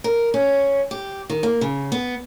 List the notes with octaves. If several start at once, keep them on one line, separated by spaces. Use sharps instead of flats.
A#4
C#4
G4
D#3
A#3
C#3
B3